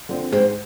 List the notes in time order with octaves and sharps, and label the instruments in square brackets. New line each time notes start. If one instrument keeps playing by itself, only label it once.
[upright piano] D3 F3 C4
[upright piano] G#2 [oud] G#3 C4